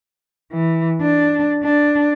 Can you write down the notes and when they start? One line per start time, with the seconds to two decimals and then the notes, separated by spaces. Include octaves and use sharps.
0.52 E3
1.01 D4
1.64 D4